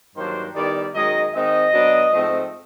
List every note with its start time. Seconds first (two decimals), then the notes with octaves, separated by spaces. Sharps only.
0.16 G2 D#3 F#3 A#3 D4 C5
0.55 D#3 G3 B3 E4 D5
0.95 F#2 D#3 G#3 D#5
1.34 D#3 G#3 C4 D#5
1.73 B2 F#3 B3 D4
2.13 G#2 F3 A3 C4